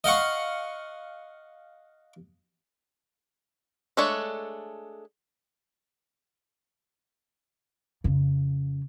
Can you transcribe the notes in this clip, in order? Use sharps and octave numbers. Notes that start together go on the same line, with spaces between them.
D#5 F5 F#5 C#6
G#3 A3 D4 A4 C#5
F2 C#3